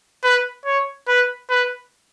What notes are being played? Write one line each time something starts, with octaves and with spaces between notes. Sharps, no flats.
B4
C#5
B4
B4